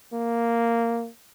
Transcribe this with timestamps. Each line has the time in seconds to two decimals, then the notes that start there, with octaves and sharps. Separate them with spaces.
0.13 A#3